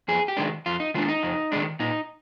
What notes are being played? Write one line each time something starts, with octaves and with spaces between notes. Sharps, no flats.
F2 G#4
G4
D#3 G#3 D4
F2 F4
D#4
D#3 G#3 D4 F4
D#4
F2
D#3 G#3 D4
A#2 D#4